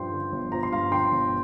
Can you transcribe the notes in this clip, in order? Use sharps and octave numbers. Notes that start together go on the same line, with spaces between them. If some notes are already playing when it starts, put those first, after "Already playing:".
Already playing: G2 F3 G5 C6
D3
G1
F3 A#5
C6
G2 F5 A#5
D3 G5 C6
G1